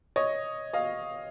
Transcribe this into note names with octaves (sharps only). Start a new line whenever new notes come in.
C#5 D#5
D#5 F5